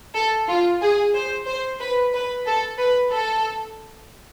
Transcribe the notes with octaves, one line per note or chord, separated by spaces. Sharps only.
A4
F4
G#4
C5
C5
B4
B4
A4
B4
A4